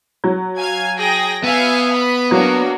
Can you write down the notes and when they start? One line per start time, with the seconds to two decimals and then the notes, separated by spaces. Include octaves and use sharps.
0.24 F#3
0.59 F5 G#5 G#6
0.99 G#4 G5 A#6
1.44 B3 E5 F5 G#5
1.93 B5
2.31 F#3 A#3 D4 F#4